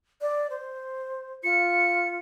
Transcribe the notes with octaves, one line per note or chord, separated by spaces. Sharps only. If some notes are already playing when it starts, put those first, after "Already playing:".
D5
C5
F4 C#7